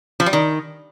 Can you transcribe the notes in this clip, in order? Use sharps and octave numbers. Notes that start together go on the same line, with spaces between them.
F3
G3
D#3